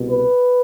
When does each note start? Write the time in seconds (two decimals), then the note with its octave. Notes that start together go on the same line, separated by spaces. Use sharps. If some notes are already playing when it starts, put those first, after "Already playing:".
Already playing: C2 B2
0.08 B4